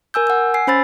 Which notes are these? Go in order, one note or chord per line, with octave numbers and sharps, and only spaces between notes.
A#4 G#5 E6 G6
F#5 E6
G#5 C7
C#4 C5 B5 E6 A6